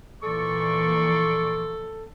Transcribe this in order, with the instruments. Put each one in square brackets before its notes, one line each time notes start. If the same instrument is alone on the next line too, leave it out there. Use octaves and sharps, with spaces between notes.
[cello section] A#2 E3 F3 [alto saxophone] A4 [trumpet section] D5 C6 C#6